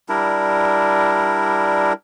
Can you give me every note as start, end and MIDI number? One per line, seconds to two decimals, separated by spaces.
0.09 1.93 55
0.09 1.93 62
0.09 1.93 64
0.09 1.93 70